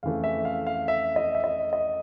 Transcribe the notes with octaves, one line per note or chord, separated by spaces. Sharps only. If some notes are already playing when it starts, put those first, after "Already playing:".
F2 C#3 E3 A3 F5
E5
F5
F5
E5
D#5
E5
D#5
D#5